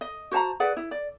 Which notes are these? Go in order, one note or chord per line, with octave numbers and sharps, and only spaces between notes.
D#5
F#4 C5 A5 A#5
G#4 B4 D5 F#5
E4
D5